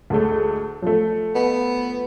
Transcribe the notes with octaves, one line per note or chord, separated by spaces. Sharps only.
D2 G#3 A3
F3 A3
B3